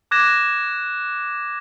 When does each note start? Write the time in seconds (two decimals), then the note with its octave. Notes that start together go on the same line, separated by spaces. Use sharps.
0.11 D6 F#6 G#6 A#6 E7